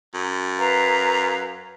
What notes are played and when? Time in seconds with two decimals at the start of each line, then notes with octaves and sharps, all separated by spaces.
0.15 F#2
0.58 B4 F5 A#5